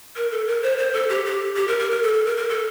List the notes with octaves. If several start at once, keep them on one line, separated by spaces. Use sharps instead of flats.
A#4
A4
A#4
C5
C5
A4
G4
G4
G4
A#4
A#4
A#4
A4
A4
A#4
A#4
A4